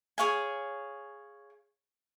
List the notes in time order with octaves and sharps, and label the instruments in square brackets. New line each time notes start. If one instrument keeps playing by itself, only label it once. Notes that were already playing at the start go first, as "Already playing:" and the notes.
[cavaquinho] G#4 C#5 F5 G#5